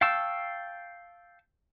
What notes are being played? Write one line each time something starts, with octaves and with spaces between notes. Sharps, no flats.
F5 G5 A5 C#6 E6